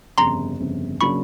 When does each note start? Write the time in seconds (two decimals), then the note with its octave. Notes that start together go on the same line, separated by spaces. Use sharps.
0.18 G1 F2 C#3 A#5 C6
0.60 G1 F2 C#3
1.01 C#3 F#3 A#3 D4 B5 C#6